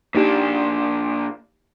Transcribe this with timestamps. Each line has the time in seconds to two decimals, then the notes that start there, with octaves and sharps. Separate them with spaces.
0.15 A#2 A#3 D4 D#4 G4